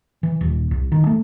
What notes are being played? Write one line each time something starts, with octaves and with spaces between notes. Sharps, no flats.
E3
D#1
C2
D#3
A3